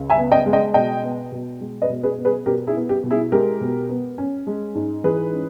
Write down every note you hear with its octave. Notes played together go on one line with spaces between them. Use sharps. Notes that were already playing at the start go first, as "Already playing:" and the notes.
Already playing: C#2 C#3
E5 G#5
B3
D#5 G5
G#3
D#5 G5
B2 D#5 G5
B3
B2
G#3
B4 D#5
B2
G#4 B4
B3
G#4 B4
B2 G4 A#4
E4 G#4
B3
G4
B2
E4 G#4
G#3 G4 A#4
B2
B3
C#4
G#3
G#2
E3 G#4 B4
C#4